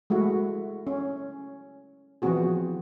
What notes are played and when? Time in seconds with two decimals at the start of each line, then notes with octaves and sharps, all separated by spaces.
0.10 G#3 A3 E4 F#4
0.87 C#4
2.22 E3 F3 B3 C4 F#4 G#4